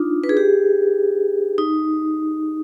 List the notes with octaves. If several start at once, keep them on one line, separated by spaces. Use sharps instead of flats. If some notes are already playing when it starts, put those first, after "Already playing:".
Already playing: D4 D#4 F4
B4
G#4
G4
D#4